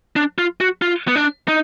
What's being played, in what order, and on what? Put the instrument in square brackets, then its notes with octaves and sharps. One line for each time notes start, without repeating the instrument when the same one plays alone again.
[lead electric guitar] D4
F4
F#4
F4
B3
D4
D#4